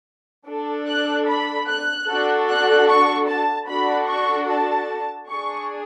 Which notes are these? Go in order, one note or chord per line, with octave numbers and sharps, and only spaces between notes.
D4 A4
F#6
B5
F#6
D4 F#4 A4
F#6
C#6
A5
D4 F#4 A4 B5
C#6
A5
D4 G#4 C#6